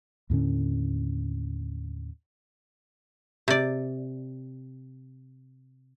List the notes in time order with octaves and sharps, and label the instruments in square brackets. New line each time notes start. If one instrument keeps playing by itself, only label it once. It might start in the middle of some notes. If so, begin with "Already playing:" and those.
[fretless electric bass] D#2 A2 D3 C#4
[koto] C3 D5